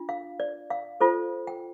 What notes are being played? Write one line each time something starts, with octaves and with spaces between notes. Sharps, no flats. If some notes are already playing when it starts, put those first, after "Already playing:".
Already playing: D4 F4
F5
D5
F5
F4 A4 C5
G5